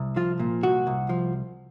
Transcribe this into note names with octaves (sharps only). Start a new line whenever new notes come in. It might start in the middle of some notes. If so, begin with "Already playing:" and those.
Already playing: C2
F3 F4
A#2
C2 F#4
C2
F3